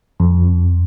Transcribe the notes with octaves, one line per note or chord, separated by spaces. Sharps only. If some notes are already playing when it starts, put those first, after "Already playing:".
F2